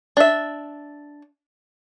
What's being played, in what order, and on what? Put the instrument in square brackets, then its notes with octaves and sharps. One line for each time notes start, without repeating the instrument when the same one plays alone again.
[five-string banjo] D4 E5